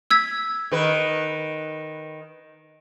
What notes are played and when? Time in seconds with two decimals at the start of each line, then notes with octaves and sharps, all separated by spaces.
0.11 E6 G#6 B6
0.72 D#3 B4